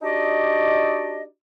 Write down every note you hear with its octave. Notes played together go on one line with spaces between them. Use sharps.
D4 D#4 F#4 G4 D5 D#5